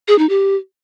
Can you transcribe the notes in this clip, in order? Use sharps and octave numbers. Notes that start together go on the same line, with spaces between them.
G#4
D#4
G4